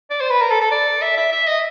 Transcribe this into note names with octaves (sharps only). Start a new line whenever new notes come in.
D5
C5
B4
A#4
A4
A4
D5
E5
E5
E5
D#5